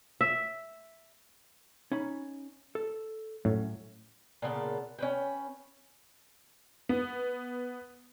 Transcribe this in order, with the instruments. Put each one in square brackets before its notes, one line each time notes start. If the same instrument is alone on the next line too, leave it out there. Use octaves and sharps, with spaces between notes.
[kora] E5
[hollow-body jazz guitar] C#4 D#4 B5
A4
[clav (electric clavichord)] A2 [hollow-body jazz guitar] F#3 C#4
[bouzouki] A#2 C#3 B3 A4
C#4 B4 G5
[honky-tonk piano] B3